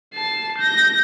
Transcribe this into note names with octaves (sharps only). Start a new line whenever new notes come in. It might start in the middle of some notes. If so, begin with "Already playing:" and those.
A5 C7
G6 A#6